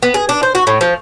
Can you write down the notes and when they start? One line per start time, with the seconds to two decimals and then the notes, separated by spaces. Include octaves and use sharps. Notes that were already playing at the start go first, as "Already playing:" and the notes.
0.03 B3
0.14 G#4
0.29 D4
0.43 C5
0.55 F#4
0.67 A2
0.81 F3